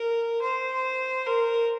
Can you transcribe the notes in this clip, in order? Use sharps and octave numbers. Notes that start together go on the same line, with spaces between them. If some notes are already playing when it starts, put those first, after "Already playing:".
Already playing: A#4
C5
A#4